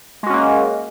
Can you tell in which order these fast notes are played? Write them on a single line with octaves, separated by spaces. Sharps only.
G#3 F#4 C#4 A#3